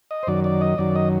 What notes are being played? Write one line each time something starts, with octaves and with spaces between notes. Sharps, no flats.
D#5
C5
F#2 D#3 F#3 D5
D5
D#5
F#2 D#3 F#3 D5
D#5